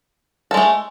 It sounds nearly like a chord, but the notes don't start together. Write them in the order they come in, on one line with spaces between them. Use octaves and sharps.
A4 G#3 A3